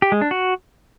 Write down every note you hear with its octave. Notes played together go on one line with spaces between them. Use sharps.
G4
G#3
D4
F#4